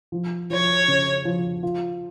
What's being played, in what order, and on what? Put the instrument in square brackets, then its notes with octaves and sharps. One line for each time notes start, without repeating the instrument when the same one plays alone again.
[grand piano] F3
[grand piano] F3 [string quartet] C#5
[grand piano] C#3
F3
F4